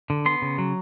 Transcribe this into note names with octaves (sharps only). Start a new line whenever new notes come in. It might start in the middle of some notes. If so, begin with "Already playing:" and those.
D3
B3 C6
C#3
F#3